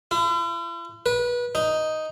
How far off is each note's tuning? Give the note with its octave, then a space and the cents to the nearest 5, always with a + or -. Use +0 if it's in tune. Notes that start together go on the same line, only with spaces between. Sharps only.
E4 +45
B4 -25
D#4 +0